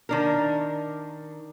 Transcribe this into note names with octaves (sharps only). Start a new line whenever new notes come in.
D#3 D4 A#4